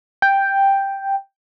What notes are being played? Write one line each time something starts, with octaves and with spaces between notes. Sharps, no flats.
G5